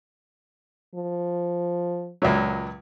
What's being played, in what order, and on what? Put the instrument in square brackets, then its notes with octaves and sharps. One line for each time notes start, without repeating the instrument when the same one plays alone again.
[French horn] F3
[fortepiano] C#2 A#2 F#3